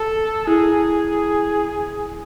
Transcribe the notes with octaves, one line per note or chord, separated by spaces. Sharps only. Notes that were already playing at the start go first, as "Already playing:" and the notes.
Already playing: A4
E4 G#4